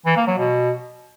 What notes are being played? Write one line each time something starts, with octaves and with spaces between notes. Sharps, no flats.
E3
A#3
F#3
B2